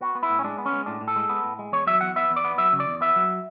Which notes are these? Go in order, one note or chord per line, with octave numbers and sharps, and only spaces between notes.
B3 F#4
B3
E4
A2
C#4
G#3 D4
B3
C#4
G#3
A2 D4
A2
A4
G#3
B3
A2
G#3
E2 C#5
F#3 E5
E2 F#5
B3 E5
E2
D5
B3
F#3 E5
C#3
D5
E2
B3 E5
F#3